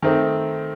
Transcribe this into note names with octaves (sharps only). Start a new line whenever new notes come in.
D#3 A3 C4 D#4